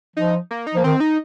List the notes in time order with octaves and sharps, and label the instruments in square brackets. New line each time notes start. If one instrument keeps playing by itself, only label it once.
[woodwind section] F3 [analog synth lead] D#4
[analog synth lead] A#3
D#4
[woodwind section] F3 [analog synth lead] A#3
[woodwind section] D#3 [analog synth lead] C4
[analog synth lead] D#4